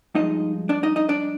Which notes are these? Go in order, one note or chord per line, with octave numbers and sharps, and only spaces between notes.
G2 F3 G#3 D#4 D#5
D4 D5
D#4 D#5
D#4 D#5
D4 D5